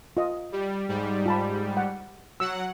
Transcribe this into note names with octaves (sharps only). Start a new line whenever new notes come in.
F4 D#5
G3
G#2 G3
F4 A5 B5
F#5
F#3 F#5 E6